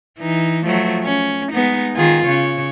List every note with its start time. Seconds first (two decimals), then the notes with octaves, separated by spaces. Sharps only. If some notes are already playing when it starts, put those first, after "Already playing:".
0.19 E3 D#4
0.66 F3 F#3 A3
1.03 C#4
1.52 G#3 B3 D#4
1.96 D#3 F4 G#4
2.27 C#3 C#5